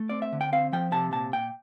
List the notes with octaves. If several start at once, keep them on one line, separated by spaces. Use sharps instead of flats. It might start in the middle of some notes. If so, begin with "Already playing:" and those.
Already playing: A3
C4 D5
E5
D3
G5
C4 F5
F3 G5
C3 A5
A#2 A5
A#2 G5